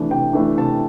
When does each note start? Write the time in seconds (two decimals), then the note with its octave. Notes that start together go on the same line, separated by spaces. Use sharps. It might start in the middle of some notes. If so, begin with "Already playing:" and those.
Already playing: C3 E3 A3 D4
0.10 C3 G5
0.33 E3 A3 D4
0.57 C3 A5